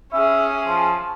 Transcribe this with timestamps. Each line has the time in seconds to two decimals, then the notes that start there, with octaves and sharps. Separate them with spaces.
0.13 C#4 G#4 E5
0.67 F3